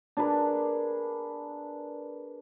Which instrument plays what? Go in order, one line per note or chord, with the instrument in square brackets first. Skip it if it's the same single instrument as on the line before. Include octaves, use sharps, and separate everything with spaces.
[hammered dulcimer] D4 G#4 A#4 B4